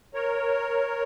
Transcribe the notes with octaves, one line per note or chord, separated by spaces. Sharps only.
A#4 C#5